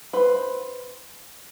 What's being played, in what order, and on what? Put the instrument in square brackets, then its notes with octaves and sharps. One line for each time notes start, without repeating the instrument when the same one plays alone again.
[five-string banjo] B4 C5